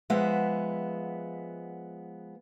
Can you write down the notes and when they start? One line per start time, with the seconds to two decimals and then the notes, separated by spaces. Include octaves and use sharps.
0.10 F3 G#3 B3 E5 F#5